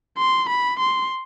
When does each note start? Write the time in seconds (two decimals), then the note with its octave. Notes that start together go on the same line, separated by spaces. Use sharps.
0.18 C6
0.49 B5
0.79 C6